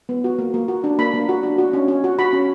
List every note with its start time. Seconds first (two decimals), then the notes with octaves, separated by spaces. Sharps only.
0.09 B3
0.24 F#4
0.38 A#3
0.54 A#3
0.68 F#4
0.84 D4
0.99 A#3 B5
1.14 A#3
1.29 F#4
1.43 D4
1.58 F#4
1.73 C#4
1.88 C#4
2.04 F#4
2.19 F#4 B5
2.33 C#4